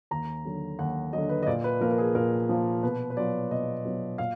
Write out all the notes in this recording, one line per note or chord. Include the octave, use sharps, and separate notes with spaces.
D#2 A#5
D3 F#3
D#2 F#5
D3 F#3 D#5
B4
D#5
A#2 D5
B4
F3 A#3 A#4
A#4
G#4
A#2 A#4
F3 A#3
B2 B4
B4
F#3 B3 F4 D5
B2 D#5
F#3 B3 F4
A#2 F5